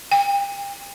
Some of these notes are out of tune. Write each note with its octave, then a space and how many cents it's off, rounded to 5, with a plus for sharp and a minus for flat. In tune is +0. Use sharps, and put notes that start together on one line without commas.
G5 +35